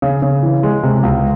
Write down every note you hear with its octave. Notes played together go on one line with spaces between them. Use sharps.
C#3
C#3
E3
G#3
C3
C#2